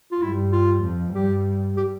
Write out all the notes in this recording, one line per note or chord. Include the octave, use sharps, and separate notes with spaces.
F4
G2 G3 E4
F4
F2 F3
G2 G3 G4
G4